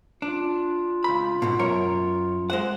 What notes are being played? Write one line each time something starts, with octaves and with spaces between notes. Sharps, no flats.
D4 F4
C#2 B5
G#2 B2
F#2 A#4 C#5
G#3 C5 F#5